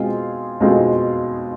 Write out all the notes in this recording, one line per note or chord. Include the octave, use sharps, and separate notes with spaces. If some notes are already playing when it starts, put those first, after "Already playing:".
Already playing: B2 G#3 C4 F4 G#4
B2 G#3 C4 F4 G#4